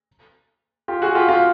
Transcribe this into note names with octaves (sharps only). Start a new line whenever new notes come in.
F4 G4
F#4 G#4
F4 G4
F4 G4